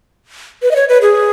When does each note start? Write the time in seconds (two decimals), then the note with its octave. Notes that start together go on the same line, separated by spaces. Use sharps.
0.62 B4
0.71 D#5
0.76 C#5
0.89 B4
1.02 G#4